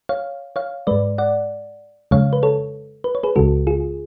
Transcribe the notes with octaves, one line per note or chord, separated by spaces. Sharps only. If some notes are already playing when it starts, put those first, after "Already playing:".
C#5 F5
C#5 F5
G#2 G#3 B4 D5
D5 F#5
F2 C#3 G#3 C#5 F5
B4
A4 C#5
B4
C#5
G#4 B4
C#2 C#3 G#3 F#4 A4
F4 G#4